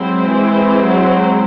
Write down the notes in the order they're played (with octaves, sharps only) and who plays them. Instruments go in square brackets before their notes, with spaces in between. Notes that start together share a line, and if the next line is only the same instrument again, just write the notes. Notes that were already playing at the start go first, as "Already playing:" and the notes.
Already playing: [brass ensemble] F#3 [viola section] G#3 C4 E4 C5
[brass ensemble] E3
F#3